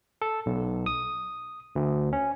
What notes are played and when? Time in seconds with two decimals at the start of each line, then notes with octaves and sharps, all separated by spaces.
0.22 A4
0.46 B1
0.86 D#6
1.76 D2
2.13 C#4